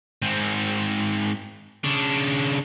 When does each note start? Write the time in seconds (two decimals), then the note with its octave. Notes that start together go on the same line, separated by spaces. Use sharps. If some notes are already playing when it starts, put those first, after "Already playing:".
0.22 G#2 C4
1.84 C#3 D4